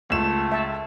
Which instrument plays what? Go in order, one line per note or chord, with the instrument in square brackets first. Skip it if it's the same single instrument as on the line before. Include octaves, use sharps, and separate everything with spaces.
[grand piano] C#2 E7 [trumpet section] A3
[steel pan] E5 A5